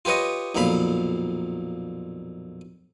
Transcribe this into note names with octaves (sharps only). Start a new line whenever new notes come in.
F4 G4 B4 C#5 D#5
B1 F2 A#2 F5 B5